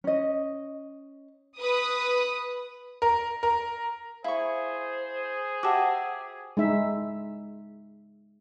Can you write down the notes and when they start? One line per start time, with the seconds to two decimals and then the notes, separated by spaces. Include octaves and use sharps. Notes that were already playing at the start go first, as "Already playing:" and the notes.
0.04 C#4 D#5
1.58 B4 D#6
3.02 A#4
3.43 A#4
4.24 E4 G#4 C5 F5 C#6
5.63 F#4 G4 E5 F#5 A5 D6
6.57 G#3 D#4 E5